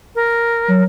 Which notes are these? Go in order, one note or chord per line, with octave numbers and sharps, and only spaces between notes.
A#4
F#3